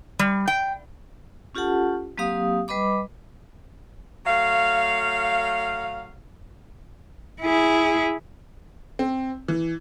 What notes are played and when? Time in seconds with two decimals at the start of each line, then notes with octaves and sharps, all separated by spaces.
0.19 G3
0.48 G5
1.55 C#4 F4 G4 A4 F#5 A5
2.18 F#3 A#3 C4 G4 F5 D#6
2.68 G3 B4 D#5 B5 D6
4.26 F#3 A3 F5
7.42 E4 G#4
8.99 C4
9.48 E3